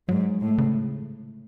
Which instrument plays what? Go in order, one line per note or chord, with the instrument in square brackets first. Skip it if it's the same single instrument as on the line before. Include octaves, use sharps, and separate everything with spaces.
[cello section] G#2 [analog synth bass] F#3
[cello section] A2
[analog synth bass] C#3